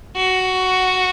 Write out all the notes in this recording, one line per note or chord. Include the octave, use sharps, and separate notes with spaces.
F#4